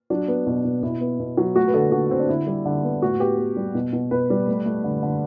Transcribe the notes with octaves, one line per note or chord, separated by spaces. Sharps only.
F#3 D4
B3
B2
B2
B2 E4
B3
B2
F#3
A3 F#4
B4
D3 A4
D3 F#4
D3 C4
D4
D3 E4
G3
D3
B3
A2 F#4
B3 G4
B3
G3
B2
B2
B2 B4
G3
A3
A3
D3
D3